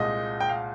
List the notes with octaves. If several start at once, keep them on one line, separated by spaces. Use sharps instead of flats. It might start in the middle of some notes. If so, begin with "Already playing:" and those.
Already playing: C2 A#2 G#3 D#5
G5
F5